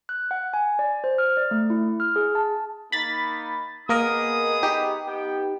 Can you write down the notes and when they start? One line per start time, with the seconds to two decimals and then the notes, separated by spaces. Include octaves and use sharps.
0.09 F#6
0.31 F#5
0.54 G#5
0.79 D5
1.04 C5
1.18 F6
1.37 D5
1.51 A3
1.70 E4
2.00 F6
2.16 G#4
2.35 A5
2.92 A#3 D#4 B5 A6
3.89 A#3 B3 G#4 A#4 D#5 D#6
4.63 D#4 G4
5.05 B3 G5